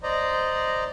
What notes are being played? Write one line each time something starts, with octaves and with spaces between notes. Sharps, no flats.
C5 D5 D#5 A#5